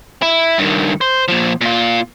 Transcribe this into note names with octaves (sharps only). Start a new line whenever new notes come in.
E4
G2 D#3
C5
A#2 F3
A#2 F4